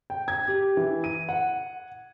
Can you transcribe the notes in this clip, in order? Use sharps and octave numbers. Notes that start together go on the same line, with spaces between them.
G5
G#6
G4
E3
D#7
F#5